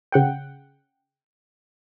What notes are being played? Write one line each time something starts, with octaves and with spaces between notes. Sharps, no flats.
C#3 F#5 G5